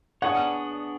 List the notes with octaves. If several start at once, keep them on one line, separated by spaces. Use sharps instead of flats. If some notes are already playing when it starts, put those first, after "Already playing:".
B3 D4 G#4 C#5 F#5